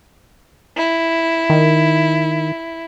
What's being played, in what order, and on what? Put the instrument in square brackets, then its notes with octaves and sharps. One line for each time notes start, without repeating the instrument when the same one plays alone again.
[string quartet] E4
[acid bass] D#3